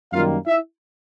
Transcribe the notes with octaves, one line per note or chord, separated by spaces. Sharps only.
F#2 D#3 G3 A#3 F4 F5
E4 E5